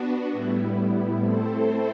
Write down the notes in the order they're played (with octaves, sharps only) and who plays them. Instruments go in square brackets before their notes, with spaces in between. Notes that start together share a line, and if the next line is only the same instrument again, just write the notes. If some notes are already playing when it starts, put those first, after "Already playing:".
Already playing: [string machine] B3 D4 F#4
A2 G3 B3 E4
A3 C4 E4 A4 C5